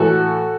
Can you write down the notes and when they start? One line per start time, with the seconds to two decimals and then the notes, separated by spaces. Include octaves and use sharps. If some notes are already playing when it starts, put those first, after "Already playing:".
Already playing: A2 E3 F#4 A4